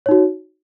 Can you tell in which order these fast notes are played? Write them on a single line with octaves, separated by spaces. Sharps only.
C#5 D#4 F#4